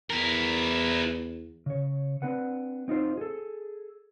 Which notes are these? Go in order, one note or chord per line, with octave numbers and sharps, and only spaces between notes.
E2 E4 A#4
C#3 C#5
C4 D4 B4 F#5
C4 D#4 F4 C5
G#4 A4